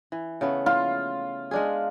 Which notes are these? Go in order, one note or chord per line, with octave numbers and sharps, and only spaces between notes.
E3
C#3 A3 B3
F4
G#3 D4 G#4